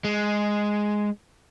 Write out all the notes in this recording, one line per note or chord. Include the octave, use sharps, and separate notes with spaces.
G#3